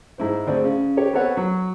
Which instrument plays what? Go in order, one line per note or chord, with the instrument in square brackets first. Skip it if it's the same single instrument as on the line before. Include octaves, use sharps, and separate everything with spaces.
[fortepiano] G#2 E4 C5
D2 C4 G#4 D5
C#3
G4 C#5
B3 C4 A4 B4 C#5 F#5
F#3